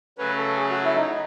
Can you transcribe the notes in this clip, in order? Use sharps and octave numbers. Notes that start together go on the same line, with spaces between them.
C#3 F#3 A3 C#4 B4
A4
G#4
F#4
E4
D#4